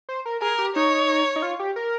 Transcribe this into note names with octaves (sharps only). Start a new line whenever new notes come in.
C5
A#4
G#4 A#4
G4
D#4 C#5
D#4
F4
G4
A#4